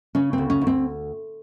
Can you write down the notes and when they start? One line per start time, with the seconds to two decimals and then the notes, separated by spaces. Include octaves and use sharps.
0.15 C#3 C#4
0.33 C4
0.38 D2
0.50 C#4
0.61 D2
0.67 C4